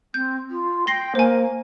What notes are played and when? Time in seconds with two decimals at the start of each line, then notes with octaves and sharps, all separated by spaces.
0.14 C4 G6
0.50 F4
0.87 G5 C6 A#6 C7
1.15 A#3 C5 G#5